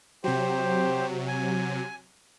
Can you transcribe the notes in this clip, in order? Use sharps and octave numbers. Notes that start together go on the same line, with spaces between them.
C3 F#3 G4 C5
G#5